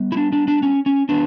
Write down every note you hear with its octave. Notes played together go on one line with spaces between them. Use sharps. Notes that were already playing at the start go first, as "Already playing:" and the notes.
Already playing: G3 B3
E4
D4
D4
D4
C#4
C#4
E3 B3 D4